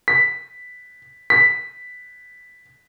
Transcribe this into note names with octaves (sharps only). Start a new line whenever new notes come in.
B6
B6